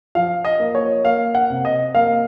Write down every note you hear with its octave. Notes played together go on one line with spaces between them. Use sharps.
F3 F5
D#5
A#3
C#5
A#3 F5
F#5
C3
D#5
A#3 F5